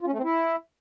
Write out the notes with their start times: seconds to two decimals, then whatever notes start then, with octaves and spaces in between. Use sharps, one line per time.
0.01 F4
0.07 C#4
0.12 A3
0.18 C4
0.24 E4